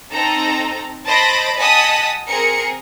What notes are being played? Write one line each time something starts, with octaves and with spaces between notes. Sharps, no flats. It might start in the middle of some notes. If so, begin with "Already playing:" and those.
C4 D#4 A4 A#5
C5 D#5 A5 B5 A#6 D7
D#5 F#5 G#5 A5 D#6 B6
C4 G#4 A#4 C#7